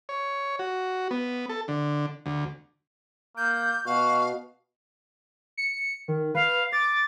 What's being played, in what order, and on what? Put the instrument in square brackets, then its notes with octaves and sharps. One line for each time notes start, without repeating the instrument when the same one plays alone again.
[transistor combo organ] C#5
F#4
B3
A4
D3
D2
[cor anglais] A#3 [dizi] G6
[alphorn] B2 [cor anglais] F#4 [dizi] F5
[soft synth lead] C#7
D#3
[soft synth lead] B4 [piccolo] F5
[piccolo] D6 [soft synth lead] A6